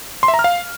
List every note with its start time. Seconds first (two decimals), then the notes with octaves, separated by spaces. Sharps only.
0.23 C6
0.28 E5
0.34 A#5
0.39 F6
0.44 F5